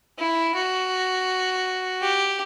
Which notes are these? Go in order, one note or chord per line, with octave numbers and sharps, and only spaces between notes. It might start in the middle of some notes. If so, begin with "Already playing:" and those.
E4
F#4
G4